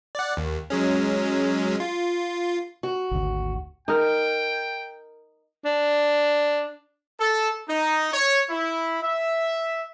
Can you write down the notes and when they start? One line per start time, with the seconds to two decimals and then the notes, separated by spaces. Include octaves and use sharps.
0.15 D5 F#5
0.37 D#2
0.70 F#3 G#3 C#4
1.80 F4
2.83 F#4
3.11 G#1 D2
3.88 D#4 A#4 G5
5.65 D4
7.19 A4
7.68 D#4
8.12 C#5
8.50 E4
9.02 E5